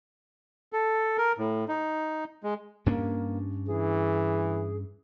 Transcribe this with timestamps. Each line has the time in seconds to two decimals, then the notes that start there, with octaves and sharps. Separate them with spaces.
0.73 A4
1.18 A#4
1.38 A2
1.68 D#4
2.43 G#3
2.86 G2 A#3 C#4 D4
3.67 E3 G#4